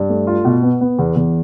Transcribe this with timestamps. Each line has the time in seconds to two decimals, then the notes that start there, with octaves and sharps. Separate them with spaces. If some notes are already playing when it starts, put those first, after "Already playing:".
Already playing: G2
0.10 A3
0.27 F4
0.45 B2
0.63 B3
0.81 B3
0.99 E2
1.16 E2